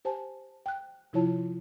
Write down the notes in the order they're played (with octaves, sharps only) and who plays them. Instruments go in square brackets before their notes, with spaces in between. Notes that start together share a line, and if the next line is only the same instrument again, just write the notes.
[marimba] G4 C5 G#5 A5
G5 F#6
C3 F3 E4 F4 C#5 A5